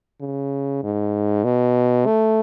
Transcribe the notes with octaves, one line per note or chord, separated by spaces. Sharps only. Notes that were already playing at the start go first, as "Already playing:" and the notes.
C#3
G#2
B2
A3